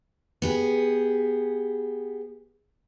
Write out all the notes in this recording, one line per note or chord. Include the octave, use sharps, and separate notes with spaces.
B3 G4 G#4